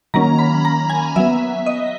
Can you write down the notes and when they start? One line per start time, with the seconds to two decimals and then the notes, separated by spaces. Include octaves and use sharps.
0.14 D#3 F#3 A#3 C#4 A#5
0.39 B5
0.65 A#5
0.90 G#5
1.16 F#3 B3 E5
1.66 D#5